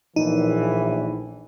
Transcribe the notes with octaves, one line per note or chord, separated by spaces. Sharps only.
A#1 A2 E3 D#4